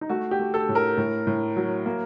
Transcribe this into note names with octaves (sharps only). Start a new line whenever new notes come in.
D#4
A3 F#4
G4
A3
A4
A2
A#4
A2
A2
F#3
A#3